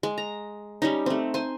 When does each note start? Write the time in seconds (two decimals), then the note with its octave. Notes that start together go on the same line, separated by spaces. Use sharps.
0.03 G#3
0.18 A#5
0.82 G3 C#4 D#4
1.06 A3 C4
1.34 C5 G#5 C6